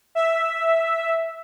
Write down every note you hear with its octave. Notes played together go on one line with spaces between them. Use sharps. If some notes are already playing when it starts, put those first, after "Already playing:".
E5